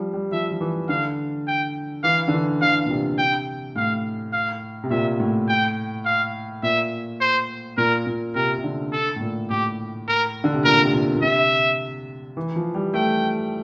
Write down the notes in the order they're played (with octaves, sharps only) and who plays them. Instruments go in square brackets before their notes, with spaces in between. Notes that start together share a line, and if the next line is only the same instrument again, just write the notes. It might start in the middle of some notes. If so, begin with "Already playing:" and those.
Already playing: [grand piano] F3 G3
G3
[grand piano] F3 [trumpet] E5
[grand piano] F3
E3
[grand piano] D3 [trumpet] F5
[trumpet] G5
[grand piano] E3 [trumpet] F5
[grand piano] D3
E3
[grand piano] D3 [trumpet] F5
[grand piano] A#2
C3
[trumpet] G5
[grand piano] A2 [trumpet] F5
[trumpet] F5
[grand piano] C3
[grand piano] A#2 [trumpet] E5
[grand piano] A2
[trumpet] G5
F5
[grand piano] A#2 [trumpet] E5
[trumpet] C5
[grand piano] A#2 [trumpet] A#4
[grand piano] A#2
[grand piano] C3 [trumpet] A#4
[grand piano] C3
D3
[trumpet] A4
[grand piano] A2
A#2
[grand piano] A2 [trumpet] G4
[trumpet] A#4
[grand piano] D3
C3
[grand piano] A#2 [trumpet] A#4
[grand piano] C3
A#2
A#2
[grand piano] C3 [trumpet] E5
[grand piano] E3
F3
G3
[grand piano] A3 [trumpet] G5